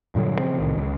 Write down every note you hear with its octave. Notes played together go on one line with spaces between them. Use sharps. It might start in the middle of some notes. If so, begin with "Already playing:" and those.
G2 A#2 D3 F#3
C#3 F3 C4
C2 A2 D#3
C#2